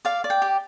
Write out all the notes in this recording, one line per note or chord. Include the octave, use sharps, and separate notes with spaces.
D5 F5
D5
G5
G4